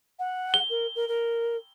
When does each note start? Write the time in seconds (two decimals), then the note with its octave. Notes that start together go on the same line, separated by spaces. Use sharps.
0.19 F#5
0.54 G7
0.70 A#4
0.95 A#4
1.08 A#4